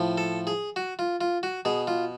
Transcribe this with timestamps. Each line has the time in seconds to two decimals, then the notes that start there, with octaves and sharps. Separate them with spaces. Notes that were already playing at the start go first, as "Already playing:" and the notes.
Already playing: A2 F3
0.18 A4
0.47 G#4
0.76 F#4
0.99 F4
1.21 F4
1.43 F#4
1.65 B2 G#4
1.87 F4